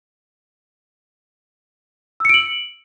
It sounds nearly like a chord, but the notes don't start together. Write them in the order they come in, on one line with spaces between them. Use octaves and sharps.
E6 C#7 D7 F#7